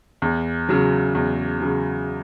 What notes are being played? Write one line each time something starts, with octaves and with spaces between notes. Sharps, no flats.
E2
C#3 F#3
E2
C#3 F#3